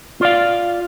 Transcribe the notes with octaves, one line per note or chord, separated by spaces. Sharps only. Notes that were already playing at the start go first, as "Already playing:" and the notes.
F4 D5 F5